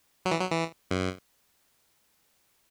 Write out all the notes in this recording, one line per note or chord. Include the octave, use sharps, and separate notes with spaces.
F#3
E3
F#3
E3
F#2